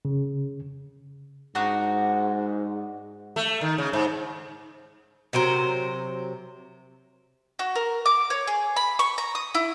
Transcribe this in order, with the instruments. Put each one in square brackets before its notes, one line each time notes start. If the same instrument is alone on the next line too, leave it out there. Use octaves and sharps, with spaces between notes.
[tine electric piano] C#3
[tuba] G#2 [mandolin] D4 D#4 F#4
[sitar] A3
D#3
C#3
G#2
[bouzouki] C3 F#3 A#4 C5
[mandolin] F#4
A#4
D6
C#5
G#4
B5
C#6
A#5
D#6
E4